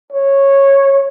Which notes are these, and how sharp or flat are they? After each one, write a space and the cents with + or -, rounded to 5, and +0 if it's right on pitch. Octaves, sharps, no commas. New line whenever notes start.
C#5 -10